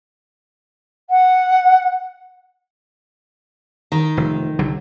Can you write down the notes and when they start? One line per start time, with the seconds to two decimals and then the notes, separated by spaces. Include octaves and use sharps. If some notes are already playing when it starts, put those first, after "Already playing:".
1.10 F#5
3.92 D#3
4.17 F1
4.59 C2 D3 F#3